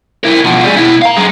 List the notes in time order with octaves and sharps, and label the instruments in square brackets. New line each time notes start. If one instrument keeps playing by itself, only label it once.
[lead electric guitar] E4 A#4
B2 F3
G3 G#4
B2 E4
F5 A#5
F#2 G#3